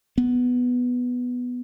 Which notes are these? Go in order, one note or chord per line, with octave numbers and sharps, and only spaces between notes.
B3